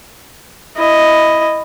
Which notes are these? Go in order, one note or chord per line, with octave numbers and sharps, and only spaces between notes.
E4 D#5